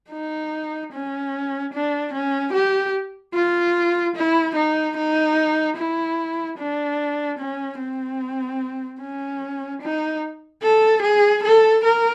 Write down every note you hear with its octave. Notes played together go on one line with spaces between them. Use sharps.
D#4
C#4
D4
C#4
G4
F4
E4
D#4
D#4
E4
D4
C#4
C4
C#4
D#4
A4
G#4
A4
A#4